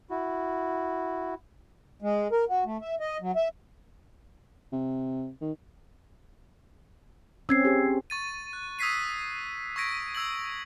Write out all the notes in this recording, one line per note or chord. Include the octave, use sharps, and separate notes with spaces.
E4 F#4
G#3
A#4
F#4
A3
E5
D#5
F#3
E5
C3
D#3
C4 C#4 E6 G#6 C7
G4 G#4
C#6 A6 D#7
F#6
D#6 E6 G#6 B6 C7 D#7
C#6 E6 G#6 A#6 B6 D7
D#6 E6 G#6 F#7